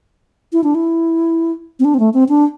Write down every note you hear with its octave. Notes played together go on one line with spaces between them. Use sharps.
E4
D4
E4
C4
D4
C4
A3
C4
D4